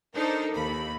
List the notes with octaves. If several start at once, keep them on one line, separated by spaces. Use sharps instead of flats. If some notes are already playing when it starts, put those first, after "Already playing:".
D4 D#4 A4 A#4 C5
D#2 B5